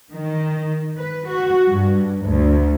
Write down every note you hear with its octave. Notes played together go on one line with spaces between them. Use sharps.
D#3
B4
F#4
G2
D2